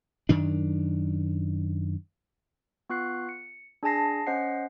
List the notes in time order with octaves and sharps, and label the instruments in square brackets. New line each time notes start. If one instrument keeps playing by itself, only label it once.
[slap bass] F#2 D#3 D4
[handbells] B3 F4 C#6 F#6 C7
C#7
D4 G#4 G#5 A5 A#6 C7
C#4 C5 D#5 F#5 C7